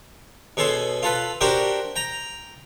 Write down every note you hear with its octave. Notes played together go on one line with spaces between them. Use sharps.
B2 C#4 G#4 A4 C6
F4 A4 B4
D4 F#4 G4 A#4 C5 G5
G5 A#5